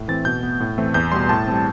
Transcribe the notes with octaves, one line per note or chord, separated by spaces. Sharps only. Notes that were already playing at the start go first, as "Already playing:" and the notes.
Already playing: A2
E3 A3 C4 A6
B2 G6
B3
A2
E3 A3 C4
E2 G6
B2 G3 C6
A2 A5
G3 C4